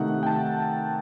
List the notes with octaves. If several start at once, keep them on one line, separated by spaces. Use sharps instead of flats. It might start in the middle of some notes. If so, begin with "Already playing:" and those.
Already playing: C3 D#3 A3 D#4 F#5
G5
A5